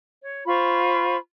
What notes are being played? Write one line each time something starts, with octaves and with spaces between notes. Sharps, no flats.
C#5
F4 C5 B5 C#6